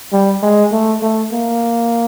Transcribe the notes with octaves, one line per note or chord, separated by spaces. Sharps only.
G3
G#3
A3
A3
A#3